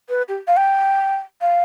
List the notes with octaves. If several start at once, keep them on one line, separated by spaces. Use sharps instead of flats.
B4
G4
F5
G5
F5